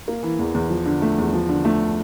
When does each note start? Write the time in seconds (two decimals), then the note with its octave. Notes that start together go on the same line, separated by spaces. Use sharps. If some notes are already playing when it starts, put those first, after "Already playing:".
0.08 A#3
0.23 E3
0.39 E2
0.54 E2
0.70 F3
0.86 D3
1.02 A3
1.18 E2
1.33 F3
1.49 D3
1.65 A3